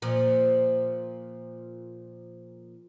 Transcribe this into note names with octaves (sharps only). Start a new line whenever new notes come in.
A#2 F3